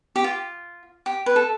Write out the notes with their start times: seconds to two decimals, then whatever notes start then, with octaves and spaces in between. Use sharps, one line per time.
0.16 G4
0.24 F4
1.06 G4
1.26 B4
1.36 A4